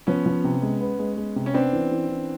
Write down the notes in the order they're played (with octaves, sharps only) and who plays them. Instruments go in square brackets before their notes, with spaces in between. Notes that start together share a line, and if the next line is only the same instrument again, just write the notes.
[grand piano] F3 [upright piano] B3 C#4
[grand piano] F3
C3
G#3
B3
G#3
G#3
C3
[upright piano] C#4
[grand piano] B3 [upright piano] C4 D4
[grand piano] E3
E3
E3